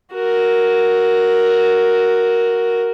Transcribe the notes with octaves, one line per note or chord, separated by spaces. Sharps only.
F#4 A#4